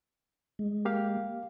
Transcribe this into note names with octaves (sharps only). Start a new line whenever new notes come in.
G#3
A#3 G4 F5